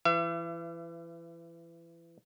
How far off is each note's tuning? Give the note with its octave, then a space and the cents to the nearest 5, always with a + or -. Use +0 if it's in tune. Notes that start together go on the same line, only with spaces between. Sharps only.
E3 +25 E5 +45